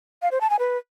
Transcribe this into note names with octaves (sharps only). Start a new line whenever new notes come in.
F5
C5
A5
G#5
B4